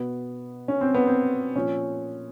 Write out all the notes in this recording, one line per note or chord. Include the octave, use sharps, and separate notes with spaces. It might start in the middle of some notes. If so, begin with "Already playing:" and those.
Already playing: B2 B3
C#4
C4
B3
C4
A#2 F3 C#4